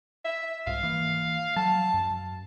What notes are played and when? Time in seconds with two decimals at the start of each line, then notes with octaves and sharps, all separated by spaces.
0.25 E5
0.67 C2 G#2 F5
0.83 E3 A#3
1.56 F#3 A5
1.94 F#2